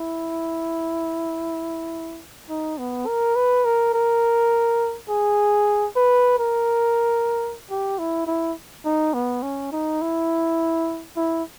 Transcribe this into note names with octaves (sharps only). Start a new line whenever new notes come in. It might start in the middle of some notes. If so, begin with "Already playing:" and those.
Already playing: E4
D#4
B3
A#4
B4
A#4
A#4
G#4
B4
A#4
G4
E4
E4
D#4
B3
C#4
D#4
E4
E4